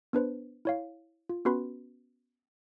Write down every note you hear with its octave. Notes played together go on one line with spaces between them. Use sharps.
B3 D4 B4 C5
E4 C#5 F5
F4
B3 C#4 F#4 B4 B5 C6